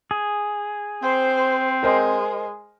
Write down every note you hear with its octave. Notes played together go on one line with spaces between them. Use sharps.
G#4
C4 C5
G#3 A#4 C5 D#5